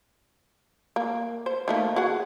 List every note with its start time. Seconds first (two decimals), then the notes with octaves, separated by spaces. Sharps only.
0.96 A#3
1.46 C5
1.68 D#3 A3 A#3
1.96 F#4 G#4 F#5